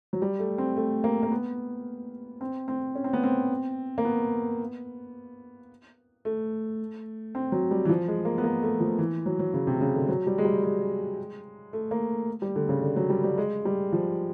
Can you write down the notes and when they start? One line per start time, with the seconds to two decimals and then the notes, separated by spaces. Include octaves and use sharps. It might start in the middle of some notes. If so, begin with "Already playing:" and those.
0.13 F#3
0.22 G3
0.39 A3
0.58 C4
0.76 A3
1.04 A#3
1.23 A#3
1.32 B3
2.41 C4
2.68 C4
2.95 C#4
3.04 C4
3.13 B3
3.23 C4
3.98 A#3
4.05 B3
6.25 A3
7.35 C4
7.52 F#3
7.71 G3
7.85 E3
7.89 F3
8.08 G#3
8.25 A#3
8.38 B3
8.44 A#3
8.63 A3
8.80 F3
8.99 E3
9.26 F#3
9.39 F#3
9.54 C#3
9.67 C3
9.81 C#3
9.95 D3
10.09 F#3
10.27 G3
10.38 G#3
10.45 G3
10.63 G#3
11.73 A3
11.91 A#3
12.42 G3
12.56 D3
12.69 C#3
12.82 D3
12.96 F#3
13.10 G3
13.24 G3
13.38 G#3
13.65 G3
13.93 F3